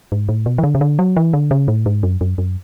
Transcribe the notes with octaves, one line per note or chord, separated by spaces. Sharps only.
G#2
A2
B2
E3
D3
C#3
D3
F#3
E3
D3
C#3
A2
G#2
F#2
F#2
F#2